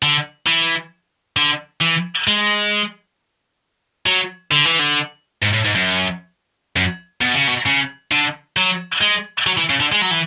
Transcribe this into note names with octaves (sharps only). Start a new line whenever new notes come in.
D3
E3
D3
E3
G#3
F#3
D3
E3
D3
G#2
A2
G#2
F#2
F#2
B2
C#3
B2
C#3
D3
F#3
G#3
F#3
E3
C#3
D3
G#3
F#3
E3